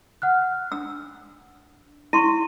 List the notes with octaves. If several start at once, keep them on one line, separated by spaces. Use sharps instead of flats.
F#5 F6 F#6
D4 E6
E4 C6 C#6 D#7